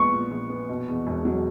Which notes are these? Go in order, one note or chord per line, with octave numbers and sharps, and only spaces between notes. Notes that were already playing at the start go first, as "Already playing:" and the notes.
Already playing: A#1 A#2 G#3 B3 C#6
A#2
A#1
B3
B2
E2
E1
F#3